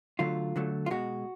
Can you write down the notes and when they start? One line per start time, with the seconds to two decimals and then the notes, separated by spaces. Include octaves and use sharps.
0.19 D3 F#3 A3 F4
0.56 D3 F#3 A3
0.86 F4
0.91 B2 G#3 F#4